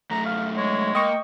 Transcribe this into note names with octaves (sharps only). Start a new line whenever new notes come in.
F#2 A3 A#5
F5
G#3 C#5
A#3 D#5 G5 C#6